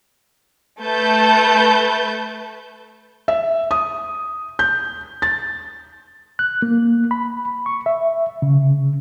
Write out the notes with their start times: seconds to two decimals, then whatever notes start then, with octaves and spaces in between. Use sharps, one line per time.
0.80 A3 B4 A5 G6
3.28 E5
3.71 D#6
4.59 G6
5.22 A6
6.39 F#6
6.62 A#3
7.11 B5
7.66 C#6
7.86 E5
8.42 C#3